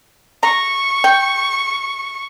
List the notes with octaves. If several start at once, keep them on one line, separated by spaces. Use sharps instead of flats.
A#5 C#6
G5